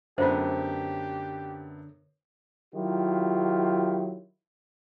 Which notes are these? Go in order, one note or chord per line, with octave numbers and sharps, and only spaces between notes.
F#2 D3 A3 B3 F4 G4 C5
D#3 F#3 E4 F4 G4